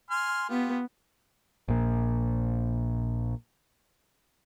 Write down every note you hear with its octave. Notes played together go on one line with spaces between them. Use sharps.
G#5 C6 F6
B3 F4 G4
A#1 A#2